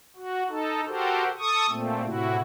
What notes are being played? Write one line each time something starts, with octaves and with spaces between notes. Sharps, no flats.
F#4
D#4 A4
F#4 G4 A4 A#4 C5
A4 C#6 D#6
A#2 A3 C4
A2 C3 E4 F#4